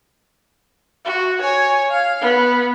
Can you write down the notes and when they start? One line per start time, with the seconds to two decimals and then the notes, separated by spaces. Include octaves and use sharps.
1.05 F#4
1.42 C#5 G#5
1.91 F5
2.21 B3